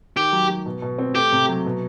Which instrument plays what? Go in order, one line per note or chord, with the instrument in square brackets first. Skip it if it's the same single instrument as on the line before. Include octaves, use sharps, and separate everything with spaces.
[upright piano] D#3 [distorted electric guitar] G4
[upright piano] F#3
F#3
B2
B2
C4
[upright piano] A3 [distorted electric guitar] G4
[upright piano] C3
F#3
B2